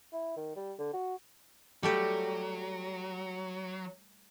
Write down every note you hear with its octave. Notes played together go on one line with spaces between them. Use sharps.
E4
D#3
G3
D3
F#4
F#3 G3 A3 G4